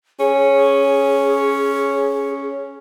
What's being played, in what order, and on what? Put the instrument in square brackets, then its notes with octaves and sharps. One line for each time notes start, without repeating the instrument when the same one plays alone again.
[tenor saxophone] C#4 [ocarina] G#4